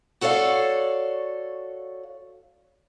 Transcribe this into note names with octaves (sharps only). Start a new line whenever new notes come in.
F#4 A4 C#5 D5 F5